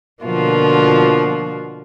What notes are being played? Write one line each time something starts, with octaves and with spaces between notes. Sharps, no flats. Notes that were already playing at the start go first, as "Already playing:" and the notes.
B2 D3 F3 A#3 F4 F#4